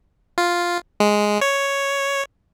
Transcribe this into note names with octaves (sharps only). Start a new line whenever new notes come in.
F4
G#3
C#5